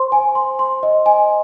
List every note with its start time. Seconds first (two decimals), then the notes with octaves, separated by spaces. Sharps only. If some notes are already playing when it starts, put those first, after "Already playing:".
Already playing: C5 C6
0.12 G#5
0.35 C6
0.59 C6
0.83 D#5
1.06 G#5